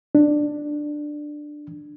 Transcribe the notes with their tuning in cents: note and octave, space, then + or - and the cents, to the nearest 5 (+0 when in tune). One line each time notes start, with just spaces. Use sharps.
D4 +10